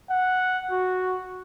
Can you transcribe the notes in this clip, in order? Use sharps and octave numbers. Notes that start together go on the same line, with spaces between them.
F#5
F#4